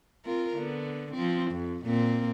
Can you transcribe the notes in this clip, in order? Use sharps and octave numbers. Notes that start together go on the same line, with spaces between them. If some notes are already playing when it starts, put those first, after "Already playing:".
C4 F4 A#4
D3 B3
F3 C4
F2
A#2 A#3 C4